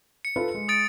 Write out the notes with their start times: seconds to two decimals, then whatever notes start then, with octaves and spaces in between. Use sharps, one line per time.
0.25 C#7
0.36 F4 A4 B4
0.54 G#3
0.68 D#6 A6 D7